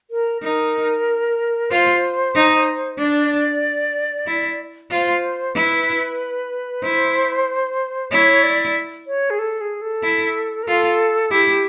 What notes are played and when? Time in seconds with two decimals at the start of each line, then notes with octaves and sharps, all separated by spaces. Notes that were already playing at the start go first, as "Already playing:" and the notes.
0.11 A#4
0.42 D#4 A#4
1.70 F4 C5
2.35 D#4
2.98 D4 D5
4.27 E4
4.91 F4 C5
5.55 E4 B4
6.83 E4 C5
8.11 E4 C#5
8.43 D5
9.07 C#5
9.30 G#4
9.39 A4
9.61 G#4
9.82 A4
10.03 E4
10.63 A#4
10.67 F4 A4
11.31 E4 G4